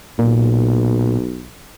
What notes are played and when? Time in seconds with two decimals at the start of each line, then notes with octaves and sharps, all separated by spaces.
0.19 B1 A#2